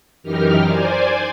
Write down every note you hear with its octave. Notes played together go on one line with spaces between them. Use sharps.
F#2 E3 D#4 G4 A#4 F6
C5 D5 G#5